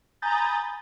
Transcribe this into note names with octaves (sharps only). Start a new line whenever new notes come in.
G#5 A#5 B5 D#6 G6 A6